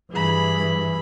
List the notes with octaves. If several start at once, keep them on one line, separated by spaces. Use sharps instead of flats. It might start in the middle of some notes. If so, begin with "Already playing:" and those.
G2 E3 G#4 B5